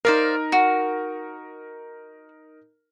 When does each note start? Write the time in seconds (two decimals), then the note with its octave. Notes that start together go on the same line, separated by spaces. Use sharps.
0.05 D#4 A#4 C5 D5 F5
0.52 F#4